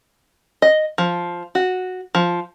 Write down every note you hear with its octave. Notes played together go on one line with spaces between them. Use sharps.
D#5
F3
F#4
F3